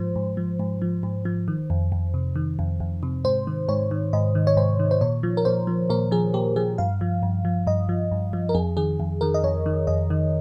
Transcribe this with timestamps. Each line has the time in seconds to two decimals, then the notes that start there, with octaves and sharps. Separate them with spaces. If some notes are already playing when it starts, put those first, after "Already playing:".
Already playing: G#2 F3 C5
0.16 G#2
0.37 F3
0.59 G#2
0.82 F3
1.03 G#2
1.25 F3
1.48 D#3
1.70 F2
1.92 F2
2.14 C3
2.36 D#3
2.59 F2
2.80 F2
3.03 C3
3.24 G#2 C5
3.47 D#3
3.69 G#2 C#5
3.91 D#3
4.13 G#2 D#5
4.35 D#3
4.47 C#5
4.57 G#2 C5
4.80 D#3
4.91 C5
5.01 A#2 C#5
5.23 F3
5.37 A#4
5.45 A#2 C5
5.67 F3
5.90 A#2 A#4
6.11 F3 G#4
6.34 A#2 G4
6.56 F3 G#4
6.78 G2 F5
7.01 F3
7.23 G2
7.45 F3
7.67 G2 D#5
7.89 F3
8.12 G2
8.33 F3
8.49 A#4
8.55 F2 G#4
8.77 D#3 G#4
9.00 F2
9.21 D#3 A#4
9.34 D#5
9.44 F2 C#5
9.66 D#3
9.87 F2 D#5
10.10 D#3